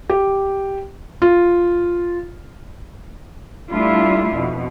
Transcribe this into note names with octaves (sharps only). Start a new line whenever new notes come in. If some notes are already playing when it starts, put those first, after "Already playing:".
G4
F4
G3 A3 D4 E4 F4
F2 B2